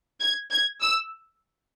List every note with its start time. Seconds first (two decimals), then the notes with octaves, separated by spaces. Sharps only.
0.20 G#6
0.51 G#6
0.82 E6